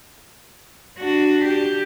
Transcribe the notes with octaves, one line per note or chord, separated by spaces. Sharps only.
D4 F#4
G4